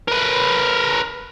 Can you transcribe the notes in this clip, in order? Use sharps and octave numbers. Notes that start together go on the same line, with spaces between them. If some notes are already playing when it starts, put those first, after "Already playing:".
A#4 B4